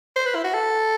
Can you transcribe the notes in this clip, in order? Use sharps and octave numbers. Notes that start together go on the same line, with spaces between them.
C5
B4
E4
F#4
A4